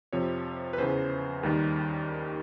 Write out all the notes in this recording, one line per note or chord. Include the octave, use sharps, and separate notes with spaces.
F2 C3 F3 C#5
B4
E2 C#3 E3 C5
D#2 D#3 G3 A#4